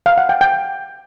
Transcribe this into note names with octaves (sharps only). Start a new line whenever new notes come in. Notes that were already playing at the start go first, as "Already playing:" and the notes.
F5
F#5
G5
G5